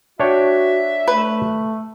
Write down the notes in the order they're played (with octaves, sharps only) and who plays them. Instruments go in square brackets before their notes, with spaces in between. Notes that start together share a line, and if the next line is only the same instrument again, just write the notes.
[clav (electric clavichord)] D4 C#5 G5 [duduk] F#4 [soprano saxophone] E5
[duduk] A3 [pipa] B4